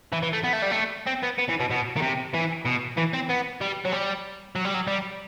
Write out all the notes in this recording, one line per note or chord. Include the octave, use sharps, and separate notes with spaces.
E3
E3
A3
B3
A3
G3
A3
C4
B3
B3
E3
B2
B2
D#3
C3
E3
B2
E3
C4
B3
G3
F#3
G3
F#3
G3
F#3
G3